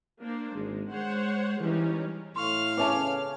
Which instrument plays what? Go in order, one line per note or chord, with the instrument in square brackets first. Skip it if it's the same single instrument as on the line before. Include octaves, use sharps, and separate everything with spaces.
[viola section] A#3 D4 C5
[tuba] G#1 [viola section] G#3
[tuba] G#3 [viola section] C5 C#5 F#5
[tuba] E3 [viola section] G3 C#4 D#4
[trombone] A2 [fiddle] F5 F6 [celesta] C6 C#6
[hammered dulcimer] C#3 C#4 D6 [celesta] B4 E5 A5